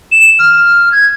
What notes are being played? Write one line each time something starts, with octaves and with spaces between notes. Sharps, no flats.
E7
F6
G#6